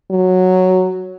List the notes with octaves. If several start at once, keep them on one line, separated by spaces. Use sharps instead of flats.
F#3